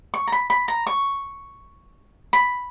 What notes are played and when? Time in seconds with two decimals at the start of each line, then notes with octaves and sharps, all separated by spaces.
0.14 C#6
0.27 A#5
0.32 B5
0.50 B5
0.68 A#5
0.87 C#6
2.33 B5